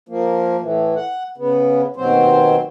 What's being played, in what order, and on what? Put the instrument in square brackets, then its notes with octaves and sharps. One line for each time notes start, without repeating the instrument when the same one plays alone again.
[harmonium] F3 A#3
A2 E3
F#5
C#3 B3
D#2 B2 F#3 C4 C5